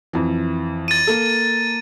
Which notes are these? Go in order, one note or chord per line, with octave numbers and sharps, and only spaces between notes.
F2 E3
A6 D#7
A#3 A4